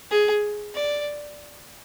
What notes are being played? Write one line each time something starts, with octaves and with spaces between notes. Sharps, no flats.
G#4
D5